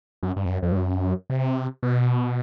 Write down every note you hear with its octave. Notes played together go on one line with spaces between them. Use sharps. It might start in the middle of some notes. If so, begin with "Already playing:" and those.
F#2
G2
F2
F#2
F2
G2
F#2
C3
B2